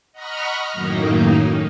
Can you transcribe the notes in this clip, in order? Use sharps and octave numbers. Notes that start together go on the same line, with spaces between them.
D#5 F#5 A#5 B5 C#6 F6
F#2 A2 D#3 F#3 A#3 D#4